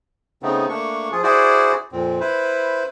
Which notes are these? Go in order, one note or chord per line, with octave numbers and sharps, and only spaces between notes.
C#3 A3 B3 C4 D#4
A3 A#3 D4 C#6
F3 F4 G#4
E4 F#4 G#4 C5 D5
F2 A#2 C4
E4 B4 C5